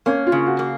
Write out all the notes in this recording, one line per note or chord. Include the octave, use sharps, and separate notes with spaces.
A#3 C#4
F4
C#3
F#4
A#3